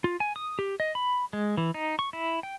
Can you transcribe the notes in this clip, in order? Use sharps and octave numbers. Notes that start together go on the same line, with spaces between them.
F4
G#5
D#6
G4
D#5
B5
G#3
E3
D#4
C#6
E4
G5